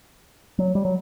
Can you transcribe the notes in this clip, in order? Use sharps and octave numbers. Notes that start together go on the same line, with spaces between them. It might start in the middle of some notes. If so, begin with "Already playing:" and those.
F#3
G3
F#3